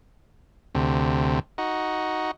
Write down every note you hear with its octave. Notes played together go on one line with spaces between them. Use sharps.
D2 C3
D#4 F#4